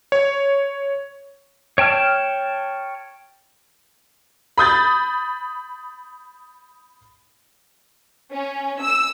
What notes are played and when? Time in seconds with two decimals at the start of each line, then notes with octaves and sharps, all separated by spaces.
0.12 C#5
1.78 C#5 G5 A5 F6
4.58 B5 D#6 G6 A6
8.33 C#4
8.82 E6